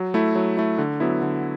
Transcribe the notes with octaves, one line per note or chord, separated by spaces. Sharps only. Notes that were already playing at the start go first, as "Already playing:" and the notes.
Already playing: F#3
A3 E4
F#3
A3 E4
D3
F#3 B3 E4
D3